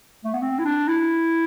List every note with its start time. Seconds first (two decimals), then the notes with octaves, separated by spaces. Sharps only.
0.24 A3
0.33 B3
0.42 C4
0.59 E4
0.65 D4
0.88 E4